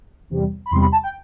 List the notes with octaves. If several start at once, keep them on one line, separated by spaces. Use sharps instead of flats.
E2 C3 G3
B5
E2 C3 G3 C6
B5
A5
G5